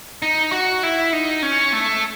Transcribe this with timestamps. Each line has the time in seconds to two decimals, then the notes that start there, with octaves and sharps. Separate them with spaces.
0.22 D#4
0.52 F#4
0.83 E4
1.13 D#4
1.43 C#4
1.73 A3